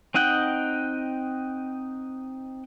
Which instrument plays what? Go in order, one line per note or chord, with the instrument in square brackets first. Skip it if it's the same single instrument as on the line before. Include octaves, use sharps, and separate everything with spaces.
[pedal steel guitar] C4 D#4 D#5 F#5 G5